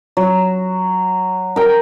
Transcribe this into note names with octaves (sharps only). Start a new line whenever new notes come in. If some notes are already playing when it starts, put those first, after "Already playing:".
F#3
A#4 G5